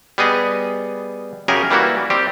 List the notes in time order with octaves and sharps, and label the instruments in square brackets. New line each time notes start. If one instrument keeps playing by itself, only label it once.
[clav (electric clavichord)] G3 B3 G#4 D#5
F#2 C#3 G4 G#4 A#4 G#5
E3 G3 A#3 E4 F#4
G3 C4 G4